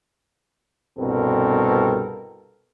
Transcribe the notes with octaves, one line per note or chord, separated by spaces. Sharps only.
C2 G2 B2 C4 A4 A#4